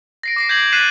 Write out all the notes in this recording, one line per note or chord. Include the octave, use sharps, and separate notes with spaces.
A#6 C7 D7
D6 A#6 C7
G6 G#6 B6 D7 F#7
F#6 A6 B6 C7 D#7 E7